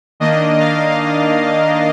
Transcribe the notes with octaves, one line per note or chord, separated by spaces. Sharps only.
D#3 A#3 D4 D#5
F5